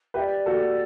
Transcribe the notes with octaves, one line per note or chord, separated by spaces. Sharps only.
G4 B4 E5
D5
F#4 A4